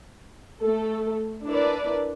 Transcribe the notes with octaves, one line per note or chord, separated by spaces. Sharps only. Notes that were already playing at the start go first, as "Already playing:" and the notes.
A3 A4
D4 E4 A#4 B4 D5